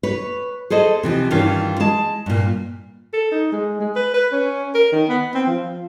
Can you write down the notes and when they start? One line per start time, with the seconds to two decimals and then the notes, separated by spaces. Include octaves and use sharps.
0.03 B4 C#5
0.70 G#4 A4 C5 D#5
1.03 C3 E3 F3
1.31 G2 D#3 E3 C#4 F4
1.80 G#3 A5
2.26 G2 A#2
3.13 A4
3.32 D#4
3.52 G#3
3.80 G#3
3.96 B4
4.14 B4
4.32 C#4
4.74 A#4
4.92 D#3
5.09 B3
5.34 C4
5.47 F3